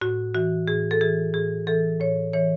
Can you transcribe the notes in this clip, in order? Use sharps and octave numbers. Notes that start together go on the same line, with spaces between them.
A2 F#4
E3 F#4
A2 G#4
A4
E3 G#4
A2 G#4
E3 A4
A2 C#5
E3 C#5